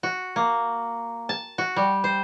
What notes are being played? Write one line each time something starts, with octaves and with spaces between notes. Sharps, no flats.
F#4
A#3
A5
F#4
G3
C5